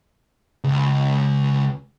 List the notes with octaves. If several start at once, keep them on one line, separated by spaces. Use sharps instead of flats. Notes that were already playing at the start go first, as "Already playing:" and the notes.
C#2